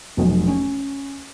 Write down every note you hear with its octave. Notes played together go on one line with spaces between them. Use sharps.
F1 B1
C#4